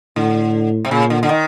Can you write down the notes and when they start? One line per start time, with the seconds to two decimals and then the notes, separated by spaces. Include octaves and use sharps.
0.16 A2 D3
0.85 C3
0.91 A#2 C#3
1.10 D3
1.23 D3
1.29 D#3